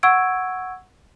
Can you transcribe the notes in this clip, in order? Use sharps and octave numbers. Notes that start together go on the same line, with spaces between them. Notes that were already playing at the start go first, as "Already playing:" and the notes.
F#5 C#6 E6 G#6 D7